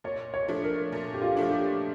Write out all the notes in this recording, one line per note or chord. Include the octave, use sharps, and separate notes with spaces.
A#2 C#5
C#5
F3 A3 D4
A#4
A#2
G4
F4
F3 A3 D4
G4